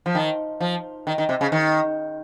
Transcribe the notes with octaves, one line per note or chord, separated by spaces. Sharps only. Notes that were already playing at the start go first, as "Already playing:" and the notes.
F3
D#3
F3
D#3
D#3
C3
C#3
D#3